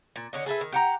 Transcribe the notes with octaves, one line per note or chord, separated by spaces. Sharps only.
A#2
D3 C#5 D#5
G#4 A4 B4 E5
D#3
G4 F#5 A#5